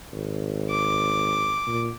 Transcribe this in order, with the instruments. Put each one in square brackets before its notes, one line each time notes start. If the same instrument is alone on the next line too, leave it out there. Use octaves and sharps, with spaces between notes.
[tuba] G#1
[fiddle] D6
[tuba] A#2